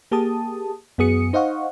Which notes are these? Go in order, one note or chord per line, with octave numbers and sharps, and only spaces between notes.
A#3 G4 G#4 A5 D#6
F#2 B3 F#4 G#4 D#6 C#7
D#4 C5 D#5 F5 F#5 C#6